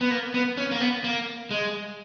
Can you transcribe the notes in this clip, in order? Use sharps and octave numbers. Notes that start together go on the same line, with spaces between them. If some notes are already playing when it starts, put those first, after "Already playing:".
B3
A#3
B3
C#4
A#3
B3
A#3
G#3